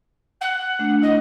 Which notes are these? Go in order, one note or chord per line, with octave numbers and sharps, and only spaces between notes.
F#5
A3 D4
E4 D#5